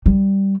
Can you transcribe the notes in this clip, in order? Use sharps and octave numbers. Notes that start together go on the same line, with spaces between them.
G3